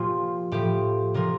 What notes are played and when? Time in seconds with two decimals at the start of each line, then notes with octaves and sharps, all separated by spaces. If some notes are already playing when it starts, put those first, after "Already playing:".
Already playing: A#2 F3 F4 G4
0.52 A2 F3 G4
1.14 C3 F3 A#4